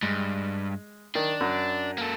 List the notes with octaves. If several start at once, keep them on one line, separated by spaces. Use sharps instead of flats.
G2 G#3
D#3 D4
F#2
A#3 A4